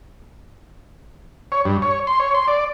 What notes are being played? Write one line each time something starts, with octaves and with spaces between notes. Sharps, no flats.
C#5
G2
C#5
C6
C#5
C6
D5